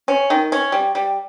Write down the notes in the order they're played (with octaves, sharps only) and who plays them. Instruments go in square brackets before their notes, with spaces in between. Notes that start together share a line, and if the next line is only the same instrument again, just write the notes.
[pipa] C#4
D#3
C#4
G3
G3